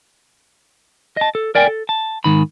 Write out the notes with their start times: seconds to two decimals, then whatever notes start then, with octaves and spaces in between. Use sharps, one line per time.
1.17 D#5 A5
1.35 A4
1.55 A#4 D5 G5 G#5
1.68 A4
1.89 A5
2.24 G#2 D#3 B5